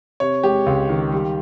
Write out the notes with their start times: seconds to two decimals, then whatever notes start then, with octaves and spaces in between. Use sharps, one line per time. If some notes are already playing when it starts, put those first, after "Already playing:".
0.20 C3 C#5
0.43 G#3 G4
0.66 C#2
0.89 D#3
1.12 G3